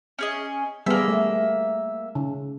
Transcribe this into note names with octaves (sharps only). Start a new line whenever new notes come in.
C#4 G#4 D#5
G3 A#3 B3 G#4 E5
A3
C#3